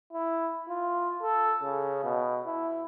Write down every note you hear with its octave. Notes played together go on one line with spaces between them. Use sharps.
E4
F4
A4
C#3
B2
E4